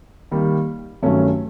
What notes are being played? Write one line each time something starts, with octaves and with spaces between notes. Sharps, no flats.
D#3 G3 A#3
G2 D#3 F#3 A3 C#4